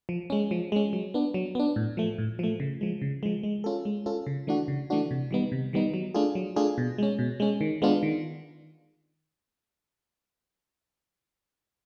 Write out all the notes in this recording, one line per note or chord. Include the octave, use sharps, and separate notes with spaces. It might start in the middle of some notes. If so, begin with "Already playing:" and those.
F3
G#3 C#4
F3
G#3 C#4
F#3
B3 D4
F#3
B3 D4
A2
F3 A3
A2
F3 A3
C#3
F3 G#3
C#3
F3 G#3
G#3
C#4 F4 A4
G#3
C#4 F4 A4
C#3
E3 A3 D4 F#4
C#3
E3 A3 D4 F#4
C3
D#3 G3 B3 D#4
C3
D#3 G3 B3 D#4
F#3
A3 D4 F4 G#4
F#3
A3 D4 F4 G#4
B2
G#3 C#4
B2
G#3 C#4
D#3
G#3 B3 D4 F4
D#3